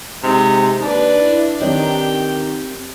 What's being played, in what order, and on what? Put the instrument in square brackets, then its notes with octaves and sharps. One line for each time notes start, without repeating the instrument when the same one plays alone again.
[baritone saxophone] C3 [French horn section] G#3 [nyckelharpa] D#4
[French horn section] D#2 [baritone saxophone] D4 [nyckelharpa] B4 D5
[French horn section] E4
[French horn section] D#3 [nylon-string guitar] C4 C#5 D#5 [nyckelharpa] G4 G5